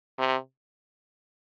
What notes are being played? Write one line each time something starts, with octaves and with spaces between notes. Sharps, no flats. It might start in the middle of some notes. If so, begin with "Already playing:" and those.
C3